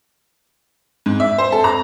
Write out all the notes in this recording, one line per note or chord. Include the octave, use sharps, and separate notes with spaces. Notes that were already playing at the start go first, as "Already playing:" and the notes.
G#2
E5
C5
A4
A#5